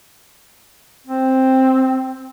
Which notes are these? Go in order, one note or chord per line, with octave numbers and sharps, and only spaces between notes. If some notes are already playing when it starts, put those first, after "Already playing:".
C4